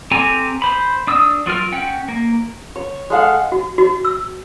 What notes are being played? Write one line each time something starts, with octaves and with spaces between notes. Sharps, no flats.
C4 G4 A4 G#5 A#5
C5 B5
D4 D#6 E6
F#3 F4 A#4 F6
C#4 F#5 G5
A#3
C#5
G#3 A4 F5 F#5
F#4
F#4
E6